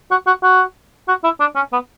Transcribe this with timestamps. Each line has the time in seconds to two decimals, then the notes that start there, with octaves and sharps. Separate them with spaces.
0.11 F#4
0.27 F#4
0.43 F#4
1.08 F#4
1.24 E4
1.40 D4
1.56 C#4
1.73 B3